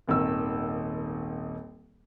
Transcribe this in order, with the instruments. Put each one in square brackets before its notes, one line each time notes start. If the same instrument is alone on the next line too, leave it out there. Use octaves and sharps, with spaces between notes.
[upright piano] D#1 G#1 D#3 E6